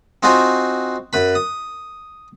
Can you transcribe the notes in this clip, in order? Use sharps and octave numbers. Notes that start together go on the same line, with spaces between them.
C4 D#4 F4 F#4 C5 G#5
F#2 B4 B5
D#6